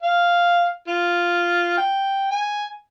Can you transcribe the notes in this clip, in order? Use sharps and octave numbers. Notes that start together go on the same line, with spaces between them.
F5
F4
G5
G#5